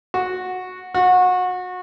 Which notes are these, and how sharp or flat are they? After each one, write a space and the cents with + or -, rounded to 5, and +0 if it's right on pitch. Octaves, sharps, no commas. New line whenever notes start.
F#4 -10
F#4 -25